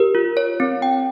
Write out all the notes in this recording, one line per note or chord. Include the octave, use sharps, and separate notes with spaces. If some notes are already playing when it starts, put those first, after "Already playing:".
Already playing: G4 A#4
F4
C#5
C4
G5